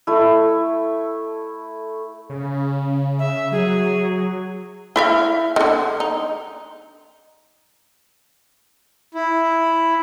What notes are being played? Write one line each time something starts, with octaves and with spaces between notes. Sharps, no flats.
A3 E4
C#3
E5
F#3 G#4
E4 E5 F5
D3 D#3
D#4
E4